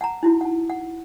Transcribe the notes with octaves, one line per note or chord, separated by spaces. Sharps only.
F#5 A5 A#5
D#4 E4 F#4
F#5 A5
F#5